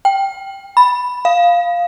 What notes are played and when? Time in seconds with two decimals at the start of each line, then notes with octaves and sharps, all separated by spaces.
0.05 G5
0.77 B5
1.25 F5